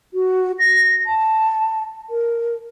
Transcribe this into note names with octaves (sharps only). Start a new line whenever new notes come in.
F#4
A#6
A5
A#4